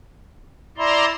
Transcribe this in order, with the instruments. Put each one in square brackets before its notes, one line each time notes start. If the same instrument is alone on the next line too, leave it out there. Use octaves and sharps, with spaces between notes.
[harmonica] E4 [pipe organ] D5 A#5 C6